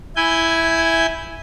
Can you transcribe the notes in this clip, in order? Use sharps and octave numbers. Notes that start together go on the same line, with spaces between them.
E4 G#5 G6